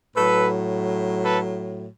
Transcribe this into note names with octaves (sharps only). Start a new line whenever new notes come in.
A2 F#3 A4 B4
A4 B4